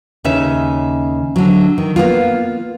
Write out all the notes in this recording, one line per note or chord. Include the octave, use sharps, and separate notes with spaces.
D#2 C#3 C#4 D#4 E5
D3 F#3
D#3
A#3 B3 F4